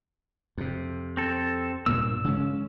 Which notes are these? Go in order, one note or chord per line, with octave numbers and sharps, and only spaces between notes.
F2 C3
C4 A4
G2 A#2 A#3 E6
C#3 G#3 C#4